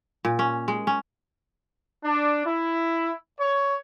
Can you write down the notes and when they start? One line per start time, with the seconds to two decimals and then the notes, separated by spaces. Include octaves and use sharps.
0.25 A#2
0.39 C#4
0.68 G#3
0.87 C#4
2.05 D4
2.46 E4
3.39 C#5